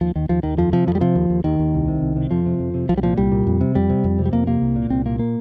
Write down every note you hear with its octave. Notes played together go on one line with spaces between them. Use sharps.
D#2 F3
D#2 D#3
D#2 F3
D#2 D#3
F2 F3
C3 F3
F2 F3
G3
C3 F3
D#2
D#2
D#2 D#3
D#2
C2
C3
C2
C3
F2 F3
C3
F2
C3
C2 F3
G3
A#2 F3
C2 G3
A#2
F2
C3
F2 G3
C3
F2
C3
G3
F2 A#3
C3 A#3
C2
A#2
C2 C4
A#2 A#3
A#3